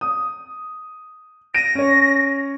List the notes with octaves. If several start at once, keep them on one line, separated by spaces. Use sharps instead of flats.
D#6
A#6 D7 D#7
C#4 C#5